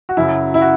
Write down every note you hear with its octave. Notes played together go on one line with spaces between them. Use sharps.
F#4
F#2 C#3 F#3 E4
E4
F#4